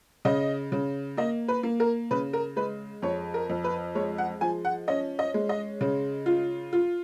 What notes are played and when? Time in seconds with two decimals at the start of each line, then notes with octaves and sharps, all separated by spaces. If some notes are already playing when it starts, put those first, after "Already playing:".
0.25 C#3 D#5
0.72 C#3
1.17 A#3 D#5
1.48 B4
1.63 A#3
1.80 A#4
2.11 C#3 B4
2.33 A#4
2.56 G#3 B4
3.02 F2 C#5
3.34 A#4
3.49 F2
3.64 B4
3.95 G#3 C#5
4.18 F#5
4.41 F3 G#5
4.65 F#5
4.88 C#4 D#5
5.19 D#5
5.34 G#3
5.49 D#5
5.81 C#3
6.26 F4
6.73 F4